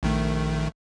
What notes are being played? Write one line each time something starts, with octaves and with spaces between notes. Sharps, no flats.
A#1 D#3 A3